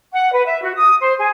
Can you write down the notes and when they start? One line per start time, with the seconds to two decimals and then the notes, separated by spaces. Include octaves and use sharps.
0.13 F#5
0.33 B4
0.44 E5
0.62 F#4
0.76 D#6
1.01 C5
1.18 G#4